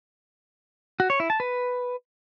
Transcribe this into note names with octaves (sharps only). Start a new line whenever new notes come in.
F#4
C#5
E4
A5
B4